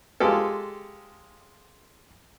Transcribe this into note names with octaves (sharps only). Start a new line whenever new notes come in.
G#3 F4 G4 A4